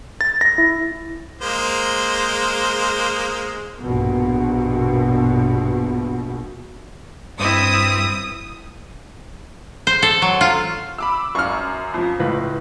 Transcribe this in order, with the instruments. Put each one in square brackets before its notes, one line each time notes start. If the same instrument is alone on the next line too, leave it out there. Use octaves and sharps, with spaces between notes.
[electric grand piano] A6
A#6
E4
[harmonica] G#3 A#3 C5
[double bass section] A#1 G2 B2
[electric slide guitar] G2 [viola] C4 E4 [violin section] D#6
[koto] C5
A4
F#3
F4
[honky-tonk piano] B5 D6 E6
[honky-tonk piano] F#2 [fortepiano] C#6 F6
[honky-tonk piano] F2 F3
[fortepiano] C#2 B4 [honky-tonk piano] A2